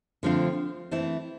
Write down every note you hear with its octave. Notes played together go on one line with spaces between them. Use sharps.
D3 F3 A3 C4 F4
E3 A3 C4 E4